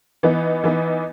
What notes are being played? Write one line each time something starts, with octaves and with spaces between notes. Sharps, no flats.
E3 B3 D#4
E3 B3 D#4